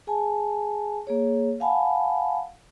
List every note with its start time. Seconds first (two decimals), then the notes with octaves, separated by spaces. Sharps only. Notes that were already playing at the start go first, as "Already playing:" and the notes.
0.07 G#4 G#5 A5
1.07 A#3 G#4 C#5
1.60 F5 F#5 G#5 A5 B5